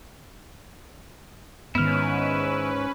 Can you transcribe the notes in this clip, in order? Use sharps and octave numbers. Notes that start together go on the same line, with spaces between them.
G#2 D#3 B3 C#4 E4 B4 F6